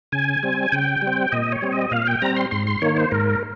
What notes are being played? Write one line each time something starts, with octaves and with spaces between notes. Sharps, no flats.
C#3 G#5
G3 C4
C#3 G5
G3
C4
A#2 D#5
C#5
G3 C4
D#5
A#2 F5
G5
G3 C4 A#5
C6
G#2 C6
C6
D#3 A#3 C#5
C5
G#2 A#4